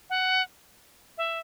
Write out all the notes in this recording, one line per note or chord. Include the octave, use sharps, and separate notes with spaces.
F#5
E5